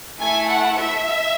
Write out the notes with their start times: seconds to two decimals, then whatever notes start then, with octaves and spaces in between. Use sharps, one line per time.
0.19 A3 E4 A4 G#5
0.49 F#5
0.78 E5